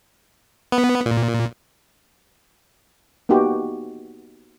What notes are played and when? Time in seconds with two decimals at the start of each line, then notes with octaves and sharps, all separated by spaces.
0.72 B3
1.06 A#2
3.29 A#3 B3 D#4 F#4 G4